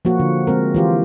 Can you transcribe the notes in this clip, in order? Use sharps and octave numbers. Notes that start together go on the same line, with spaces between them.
F3 A#3 F#4
D3
G#3 C4 A#4
E3 F4 G4